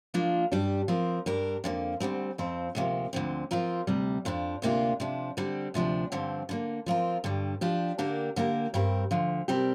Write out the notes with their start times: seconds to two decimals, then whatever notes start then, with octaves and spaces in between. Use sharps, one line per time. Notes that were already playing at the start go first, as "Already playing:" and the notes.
0.14 F3 A#3 D4 F4
0.52 G2 G3 D4 G4
0.88 F3 C4 A#4
1.26 G2 G3 D4 A#4
1.64 F2 D3 A#3
2.00 D2 D3 G3 C4
2.38 F2 F3 C4
2.75 D2 C3 F3 A#3
3.13 D2 D3 F3 C4
3.51 F3 C4 F4 A#4
3.87 D2 C3 G3
4.25 F2 F3 D4
4.62 D2 C3 A#3 D4 F4
5.00 C3 F3 D4
5.37 D3 G3 C4
5.74 D2 C3 F3 D4
6.12 G2 D3 F3 C4
6.49 D3 G3 A#3
6.86 F3 C4 F4 A#4
7.24 G2 D3 G3
7.61 F3 D4 G4
7.98 D3 A#3 D4 G4 A#4
8.36 D3 A#3 G4 A#4
8.74 G2 G3 C4 A#4
9.11 D2 D3 F3
9.48 C3 G3 C4 G4 A#4